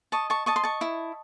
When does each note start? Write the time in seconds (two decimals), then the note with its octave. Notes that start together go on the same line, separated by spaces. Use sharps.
0.12 D#5 A5 C#6
0.30 A5 C#6
0.46 D#5 A5 C#6
0.56 C6
0.64 A5 C#6
0.81 E4